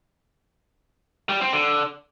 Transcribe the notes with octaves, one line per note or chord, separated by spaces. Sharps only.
G3
C4
D3